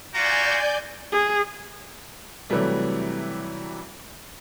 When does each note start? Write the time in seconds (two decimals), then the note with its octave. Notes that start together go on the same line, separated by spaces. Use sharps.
0.14 F4 F#4 D5 G#5 A#5 G6
1.12 G#4
2.50 C3 E3 F#3 G3 A3